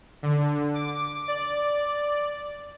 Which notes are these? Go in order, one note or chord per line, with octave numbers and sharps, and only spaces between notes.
D3
D6
D5